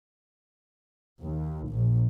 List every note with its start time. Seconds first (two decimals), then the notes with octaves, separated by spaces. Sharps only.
1.22 D#2
1.71 A#1